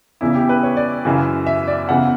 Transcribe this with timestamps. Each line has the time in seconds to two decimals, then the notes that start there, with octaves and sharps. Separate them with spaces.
0.21 E2 C#3 E3 E4
0.35 G4
0.49 B4
0.63 C#5
0.77 D5
1.05 F#2 C#3 E3
1.47 E5
1.68 D5
1.89 E2 C#3 E3 F#5